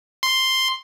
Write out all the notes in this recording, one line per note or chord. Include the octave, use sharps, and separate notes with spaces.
C6